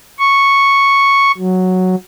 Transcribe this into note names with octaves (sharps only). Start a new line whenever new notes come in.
C#6
F#3